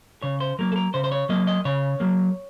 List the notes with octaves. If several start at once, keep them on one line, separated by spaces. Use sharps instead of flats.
C#3 C#5
C5
F#3 A#3 A#4
A4
A#4
C#3 C5
C5
C#5
F#3 A#3 D#5
D#5
C#3 C#5
F#3 A#3